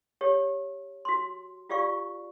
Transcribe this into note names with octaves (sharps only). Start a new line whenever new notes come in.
G4 C#5
F#4 C6
F4 G4 D5 F5 C#6